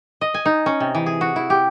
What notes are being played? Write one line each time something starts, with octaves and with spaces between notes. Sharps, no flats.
D#5
G#5
D#4
C#4
C3
E3
G#4
F#4
E4
G4